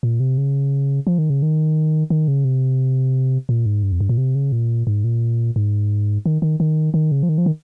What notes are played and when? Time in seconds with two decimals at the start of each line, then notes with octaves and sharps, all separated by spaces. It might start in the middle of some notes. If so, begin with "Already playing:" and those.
0.03 A#2
0.20 C3
0.38 C#3
1.07 F3
1.18 D#3
1.30 C#3
1.42 D#3
2.10 D#3
2.28 C#3
2.45 C3
3.49 A#2
3.66 G#2
3.83 G2
3.92 F2
4.01 G2
4.09 A#2
4.18 C3
4.35 C#3
4.52 A#2
4.87 G#2
5.04 A#2
5.56 G#2
6.26 D#3
6.42 D#3
6.60 D#3
6.94 D#3
7.12 C#3
7.23 F3
7.29 D#3
7.38 F3
7.46 D#3